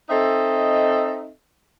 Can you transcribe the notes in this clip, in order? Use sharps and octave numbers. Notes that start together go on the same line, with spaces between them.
C4 D#4 A4 D#5 E5